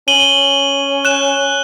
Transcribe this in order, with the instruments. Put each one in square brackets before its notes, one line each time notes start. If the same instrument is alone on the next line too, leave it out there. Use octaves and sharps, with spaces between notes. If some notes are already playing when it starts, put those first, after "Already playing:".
[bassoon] C#4 [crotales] D#7 F#7 G7
[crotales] F#6 E7